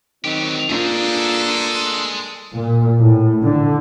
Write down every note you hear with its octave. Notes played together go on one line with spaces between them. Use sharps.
D#3 F#3 C4 D#4 G4
A#3 D4 F4 G#4 A4 C5
A#2
A2
D3